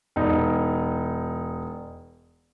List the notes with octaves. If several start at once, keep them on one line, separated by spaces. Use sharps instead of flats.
E1 D#4